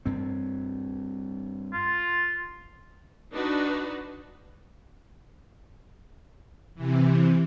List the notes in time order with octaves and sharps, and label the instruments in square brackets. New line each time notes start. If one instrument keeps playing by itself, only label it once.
[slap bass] G2 C4
[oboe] F4
[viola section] D4 D#4 F#4 B4
[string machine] C3 E3